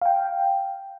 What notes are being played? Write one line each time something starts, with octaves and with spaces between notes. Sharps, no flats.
F5 G5